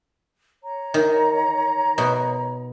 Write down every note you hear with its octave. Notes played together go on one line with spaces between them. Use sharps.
C#5 A#5
D#3
B2